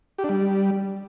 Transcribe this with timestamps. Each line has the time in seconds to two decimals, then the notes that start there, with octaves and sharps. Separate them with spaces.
0.18 G4
0.24 D4
0.29 G3